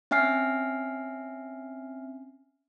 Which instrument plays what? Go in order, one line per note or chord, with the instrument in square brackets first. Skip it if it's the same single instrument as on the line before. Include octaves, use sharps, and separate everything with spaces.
[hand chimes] C4 C#4 E5 G#5 F6 C7